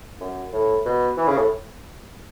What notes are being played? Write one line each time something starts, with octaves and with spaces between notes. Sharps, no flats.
F#2
A2
B2
E3
C#3
A2